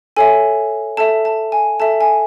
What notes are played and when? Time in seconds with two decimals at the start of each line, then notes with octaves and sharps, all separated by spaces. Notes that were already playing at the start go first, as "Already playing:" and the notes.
0.17 A4 C#5 E5 G#5
0.97 A4 E5 A5
1.25 A5
1.52 G#5
1.80 A4 E5 A5
2.01 G#5